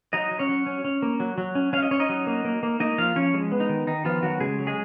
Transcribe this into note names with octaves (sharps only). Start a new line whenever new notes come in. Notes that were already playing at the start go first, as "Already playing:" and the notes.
F#3 D#4 D#5
F#3
C#4 C#5
F#3
C#4
C#4
A#3
F#3
F#3
C#4
C#4 F5
D#5
C#4 C#5
D#4 D#5
F#3
A#3
A#3
A#3
A#3 D#4 D#5
F3 F4 F5
F3 C#4 C#5
G#3
B3
D#4
D#3
D#3 D#4
F3 B3 F4
D#3 F#3 F#4
C#3 G#3 G#4
F#3
G#3 G#4